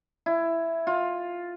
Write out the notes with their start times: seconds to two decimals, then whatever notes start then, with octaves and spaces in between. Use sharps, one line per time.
0.26 E4
0.87 F4